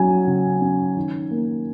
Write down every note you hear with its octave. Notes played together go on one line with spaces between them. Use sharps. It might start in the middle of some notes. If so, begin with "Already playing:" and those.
Already playing: F#3 C#4 G#5
C#3
C#4
D#3
A#3